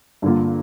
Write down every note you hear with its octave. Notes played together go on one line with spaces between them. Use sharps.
G2 D3 A#3 F4